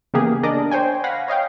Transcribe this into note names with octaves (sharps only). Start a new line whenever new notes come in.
C#3 E3 A#3 B3 G4 G#4
D4 A#4 D5 D#5
C5 C#5 G5 G#5
F5 F#5 G#5 B5 A#6
C#5 D#5 F5 G5